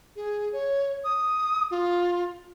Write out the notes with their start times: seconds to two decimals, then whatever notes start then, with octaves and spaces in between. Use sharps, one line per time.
0.16 G#4
0.52 C#5
1.04 D#6
1.71 F4